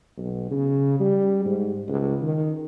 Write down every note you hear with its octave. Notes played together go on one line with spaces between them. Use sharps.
B1
C#3
G3
G#2
C#2
D#3